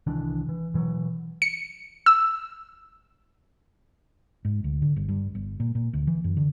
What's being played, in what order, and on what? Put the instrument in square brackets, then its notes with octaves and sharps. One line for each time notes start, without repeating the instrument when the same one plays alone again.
[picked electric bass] C2 D#3 E3 D4
E3
B2 E3 F#3
[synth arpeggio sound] C#7
E6
[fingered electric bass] G#2
D2
D3
G1
G2
G1
A#2
A#2
D2
E3
F#2
D3